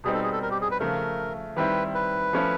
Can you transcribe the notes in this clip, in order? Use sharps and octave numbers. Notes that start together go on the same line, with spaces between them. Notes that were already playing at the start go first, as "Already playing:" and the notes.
B2 G3 C4 D#4 G#4
A4
G#4
A4
A#4
G4
G#4
B4
C#3 F3 A3 A#4
D#3 G3 C4 E4 B4
B4
F3 A3 C#4 E4